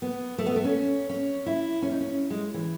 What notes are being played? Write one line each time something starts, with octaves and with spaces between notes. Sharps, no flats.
B3
A3
B3
A3
C#4
C#4
E4
C#4
D#4
C#4
G#3
E3